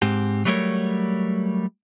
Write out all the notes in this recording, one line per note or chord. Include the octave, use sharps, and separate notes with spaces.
G#2 C4 G4
F#3 G3 A3 G#4 A#4 C#5